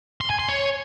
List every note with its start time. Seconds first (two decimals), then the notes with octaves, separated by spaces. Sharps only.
0.21 C6
0.30 G#5
0.39 C6
0.48 C#5